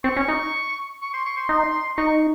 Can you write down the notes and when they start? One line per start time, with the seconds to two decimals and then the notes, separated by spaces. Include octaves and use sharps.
0.04 C4 C#6
0.17 C#4
0.28 D#4
1.01 C#6
1.13 C6
1.25 C#6
1.37 C6
1.49 D#4
1.97 D#4 C#6